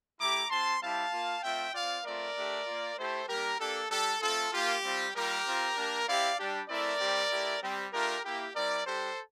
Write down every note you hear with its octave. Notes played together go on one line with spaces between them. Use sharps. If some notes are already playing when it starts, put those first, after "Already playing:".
A3 E4 G4 A#5 D6
C4 F4 A5 C6
G3 C4 E4 G4 F5 A5
A#3 F4
A3 C4 F4 E5 G5
C4 F4 D5 F5
A3 C4 F4 A#4 D5
A3 D4 G4
A#3 F4
A3 E4 G4 A4 C5
G3 A#3 D4 G4 A#4
A#3 D4 G4 A4
G3 D4 G4 A4
A3 C4 F4 A4
A#3 F4 G4
G3 C4 F4
G3 A#3 F4 G4 A#4
C4 F4
A#3 D4 G4
C4 E4 G4 D5 F5
G3 D4 G4
A3 C4 E4 A#4 D5
G3 C4 G4
A3 E4 G4
G3 C4 G4
A3 D4 F4 G4 A#4
A#3 E4 G4
G3 C4 E4 A#4 D5
G3 D4 G4 A4 C5